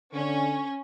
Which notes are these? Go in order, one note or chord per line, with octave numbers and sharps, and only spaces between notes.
D3 C#4